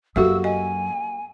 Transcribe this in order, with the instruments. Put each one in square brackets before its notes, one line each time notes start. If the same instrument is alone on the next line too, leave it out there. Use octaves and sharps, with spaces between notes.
[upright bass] F#2 F#3 [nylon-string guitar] A#3 F#4 [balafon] G4 A4 E5 [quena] E6
[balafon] D#5 [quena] G#5